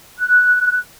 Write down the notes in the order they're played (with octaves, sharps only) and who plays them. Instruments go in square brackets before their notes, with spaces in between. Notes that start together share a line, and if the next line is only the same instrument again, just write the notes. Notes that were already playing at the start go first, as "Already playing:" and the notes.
[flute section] F#6